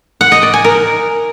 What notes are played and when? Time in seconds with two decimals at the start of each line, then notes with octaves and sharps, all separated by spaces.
0.21 F#5
0.32 D#5
0.43 D5
0.54 G#5
0.64 A#4